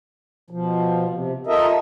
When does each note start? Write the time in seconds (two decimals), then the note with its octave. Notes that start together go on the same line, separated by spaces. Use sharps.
0.50 B2 F3
1.09 C3
1.47 F4 A4 A#4 D#5 E5